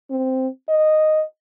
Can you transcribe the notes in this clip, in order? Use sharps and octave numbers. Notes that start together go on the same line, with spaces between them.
C4
D#5